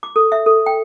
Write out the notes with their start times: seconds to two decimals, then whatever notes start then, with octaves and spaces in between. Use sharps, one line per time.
0.03 D6
0.16 A4
0.32 E5
0.46 A4
0.66 G5